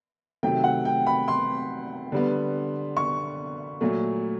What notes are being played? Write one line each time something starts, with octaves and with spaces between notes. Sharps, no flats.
C3 D#3 F#3 A3 G5
F#5
G5
B5
C6
D3 G3 B3
C#6
A#2 F#3 A3